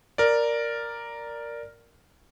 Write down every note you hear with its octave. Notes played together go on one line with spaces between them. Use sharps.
A#4 D5